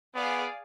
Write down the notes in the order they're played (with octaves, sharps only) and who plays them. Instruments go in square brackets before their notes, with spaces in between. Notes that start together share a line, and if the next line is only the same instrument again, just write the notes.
[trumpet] B3 [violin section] G#4 D5 F5